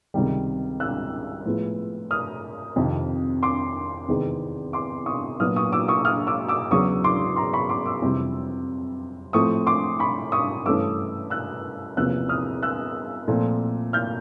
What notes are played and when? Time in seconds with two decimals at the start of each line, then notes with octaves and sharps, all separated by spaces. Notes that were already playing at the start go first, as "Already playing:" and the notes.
0.14 C#2 C3 D#3 G3
0.80 E6 F#6
1.45 A2 F3 G#3 B3
2.11 D#6 F6
2.76 F2 C3 D#3
3.43 C6 D6
4.08 E2 C3 D#3 G#3 C4
4.73 C6 D6
5.06 C#6 D#6
5.40 A#2 F#3 B3 D4 D#6 F6
5.56 C#6 D#6
5.72 D6 E6
5.88 C#6 D#6
6.05 D#6 F6
6.27 D6 E6
6.48 D6 E6
6.71 E2 C#3 F#3 C#6 D#6
7.04 C6 D6
7.36 A#5 C6
7.53 B5 C#6
7.69 C6 D6
7.86 D6 E6
8.02 F2 C3 E3 G3
9.33 A2 F3 A3 C4 C#6 D#6
9.67 C6 D6
9.99 B5 C#6
10.32 C#6 D#6
10.66 G2 E3 A3 C#4 D6 E6
11.30 E6 F#6
11.96 E2 C3 F3 A#3 C#4 E6 F#6
12.29 D#6 F6
12.63 E6 F#6
13.28 A#2 F3 A3 C4
13.93 F6 G6